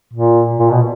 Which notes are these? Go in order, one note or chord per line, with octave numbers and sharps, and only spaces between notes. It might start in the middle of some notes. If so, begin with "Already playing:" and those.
A#2
A#2
B2